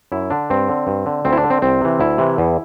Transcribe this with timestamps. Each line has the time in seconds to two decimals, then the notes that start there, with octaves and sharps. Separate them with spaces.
0.12 F#2 E4
0.30 D3 D4
0.50 G2 C4
0.69 D3
0.87 G2
1.06 D3
1.25 D2 C4
1.33 E4
1.37 D4
1.44 D3
1.50 C4
1.62 C2 C4
1.81 C3 E3
2.00 D2 E4
2.18 C3 E3
2.38 E2